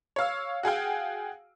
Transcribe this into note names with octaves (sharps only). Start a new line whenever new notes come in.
C#5 F5 E6
F#4 G#4 F5 G5